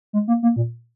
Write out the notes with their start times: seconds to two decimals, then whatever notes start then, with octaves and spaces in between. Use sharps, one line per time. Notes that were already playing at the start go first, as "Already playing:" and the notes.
0.13 G#3
0.28 A#3
0.43 A#3
0.56 A#2